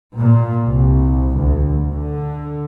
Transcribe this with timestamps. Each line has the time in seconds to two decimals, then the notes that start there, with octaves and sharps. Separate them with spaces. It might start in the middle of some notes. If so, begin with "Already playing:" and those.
0.17 A#2
0.67 C2
1.37 D2
1.91 D3